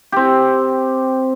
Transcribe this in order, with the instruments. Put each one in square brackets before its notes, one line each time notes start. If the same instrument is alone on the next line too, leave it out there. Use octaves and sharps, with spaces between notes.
[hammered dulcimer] C4 G4